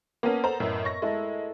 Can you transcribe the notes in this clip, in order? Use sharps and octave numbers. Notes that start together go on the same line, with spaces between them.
A#3 B3 C#4 A#4 A5
A4 C5 A#5
F#2 A2 A#4 D#5 E5
C#6 A#6
G#3 A3 E4 A5